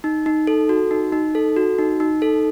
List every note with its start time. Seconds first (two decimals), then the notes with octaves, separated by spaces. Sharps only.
0.04 D#4
0.26 D#4
0.47 A4
0.69 F#4
0.91 D#4
1.13 D#4
1.35 A4
1.56 F#4
1.78 D#4
2.00 D#4
2.22 A4